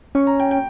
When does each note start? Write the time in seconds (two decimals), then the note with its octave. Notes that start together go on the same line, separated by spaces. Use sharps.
0.15 C#4 C#6
0.27 A#5
0.40 G5
0.51 G5